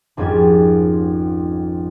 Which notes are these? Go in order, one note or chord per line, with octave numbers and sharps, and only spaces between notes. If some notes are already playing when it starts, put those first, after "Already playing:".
G#1 F2 G#2 G3 C#4 G#6